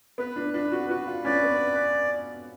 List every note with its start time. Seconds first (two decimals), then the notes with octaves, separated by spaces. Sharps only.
0.18 B3 B4
0.36 D4
0.54 D4 B4
0.72 F#4
0.89 F#4 B4
1.07 F4
1.25 C#4 D5
1.43 B3